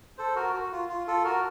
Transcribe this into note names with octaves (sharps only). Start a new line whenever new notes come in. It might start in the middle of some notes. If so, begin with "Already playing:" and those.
A4 C5
F#4 A#4
F#4
F4
F4
F4 A4
F#4 A#4